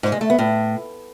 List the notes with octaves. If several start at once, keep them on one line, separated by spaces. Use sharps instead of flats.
G#2
G#3
A3
B3
A2